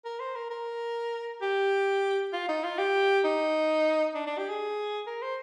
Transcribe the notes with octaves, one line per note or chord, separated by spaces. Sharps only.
A#4
C5
A#4
A#4
G4
F4
D#4
F4
G4
D#4
D4
D4
G4
G#4
A#4
C5